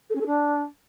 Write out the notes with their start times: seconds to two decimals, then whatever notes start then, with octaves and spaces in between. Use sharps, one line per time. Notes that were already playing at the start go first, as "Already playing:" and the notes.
0.09 A4
0.15 C#4
0.21 A4
0.26 D4